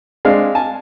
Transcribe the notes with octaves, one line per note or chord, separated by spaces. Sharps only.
G#3 C4 D4 F5
G#5 A5